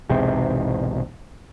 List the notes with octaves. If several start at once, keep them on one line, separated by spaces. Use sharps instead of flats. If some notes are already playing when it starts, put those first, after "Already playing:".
B1 E2 G#2 C3